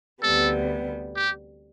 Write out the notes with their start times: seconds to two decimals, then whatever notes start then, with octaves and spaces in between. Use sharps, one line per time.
0.23 D2 C3 G3 B3 A4
1.16 G4